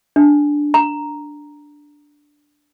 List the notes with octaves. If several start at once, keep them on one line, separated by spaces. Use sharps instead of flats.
D4
A#5